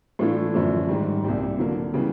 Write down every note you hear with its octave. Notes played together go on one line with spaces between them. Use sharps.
A2 E3 A3 D4 F4
F#2 D3 F3 A3 D4
G#2 D#3 G3
C2 A#2 G3
D3 F#3 A#3
C#3 E3 G3 B3